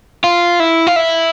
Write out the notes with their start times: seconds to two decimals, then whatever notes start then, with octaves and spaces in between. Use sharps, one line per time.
0.24 F4
0.60 E4
0.87 F4
0.96 E4